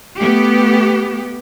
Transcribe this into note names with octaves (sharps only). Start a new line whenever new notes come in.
A3 B3 G4